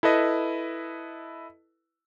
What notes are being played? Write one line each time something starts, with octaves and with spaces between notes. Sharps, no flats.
E4 A4 B4 D#5